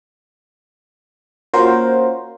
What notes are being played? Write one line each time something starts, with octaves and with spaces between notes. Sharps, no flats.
A#3 C#4 F4 F#4 A#4 C5